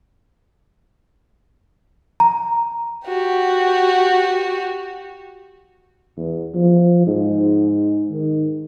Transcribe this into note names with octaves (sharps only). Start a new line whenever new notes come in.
A#5
F#4 G4
E2
F3
G#2
D#3